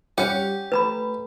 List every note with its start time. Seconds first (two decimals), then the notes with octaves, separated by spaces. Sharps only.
0.18 G3 C#4 G4 F#5
0.72 A3 B4 A#5 B5